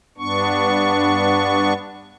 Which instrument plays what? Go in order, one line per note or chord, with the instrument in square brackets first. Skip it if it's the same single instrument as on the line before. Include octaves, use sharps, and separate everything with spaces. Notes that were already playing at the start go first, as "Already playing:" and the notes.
[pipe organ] G2 B3 D4 C#6